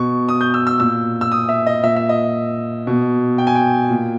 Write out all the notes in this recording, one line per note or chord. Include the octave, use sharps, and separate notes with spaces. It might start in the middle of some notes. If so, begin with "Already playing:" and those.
Already playing: B2 C#6
D#6
G6
E6
E6
A#2 E6
E6
D#6
E5
D#5
A#2 E5
E5
D#5
B2
G5
G#5
G5
A#2